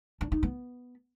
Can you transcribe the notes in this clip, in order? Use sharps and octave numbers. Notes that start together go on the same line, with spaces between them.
D4
D#4
B3